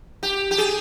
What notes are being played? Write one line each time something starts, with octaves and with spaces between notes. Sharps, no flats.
G4
G4
G#4